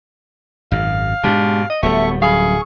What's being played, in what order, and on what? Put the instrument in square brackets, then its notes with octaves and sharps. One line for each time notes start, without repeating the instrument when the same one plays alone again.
[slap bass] G#1 F#2 [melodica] F5
[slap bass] G#2 B2 [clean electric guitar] G#3 G4 [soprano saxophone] D4
[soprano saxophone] D#5
[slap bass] D1 G3 [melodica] A3 C#6 [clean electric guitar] B3 C#5 [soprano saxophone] E5
[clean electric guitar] F#2 B5 [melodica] G#4 C#6 [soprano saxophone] F5